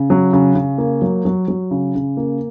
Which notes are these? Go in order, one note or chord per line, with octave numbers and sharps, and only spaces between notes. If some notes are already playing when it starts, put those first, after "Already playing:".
Already playing: C#3
F#3
C#3
C#3
A#3
F#3
F#3
F#3
C#3
C#3
A#3